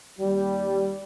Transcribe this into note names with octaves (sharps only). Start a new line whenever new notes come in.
D#2 G3